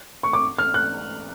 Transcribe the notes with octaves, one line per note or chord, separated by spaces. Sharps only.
C#6
D6
F6
F#6